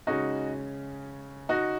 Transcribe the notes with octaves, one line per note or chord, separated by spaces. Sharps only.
C#3 G#3 C#4 D#4 F#4
D#4 F#4